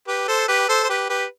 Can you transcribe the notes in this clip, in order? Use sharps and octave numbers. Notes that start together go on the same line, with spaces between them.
G4 B4
A4 C5
G4 B4
A4 C5
C5
G4 B4
G4 B4